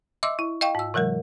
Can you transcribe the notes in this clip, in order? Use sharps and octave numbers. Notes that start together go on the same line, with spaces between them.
D#5 E5 C6 D6 E6
E4
D#5 F5 G5 C#6
G#2 E6
C3 E3 F#3 G#3 A#4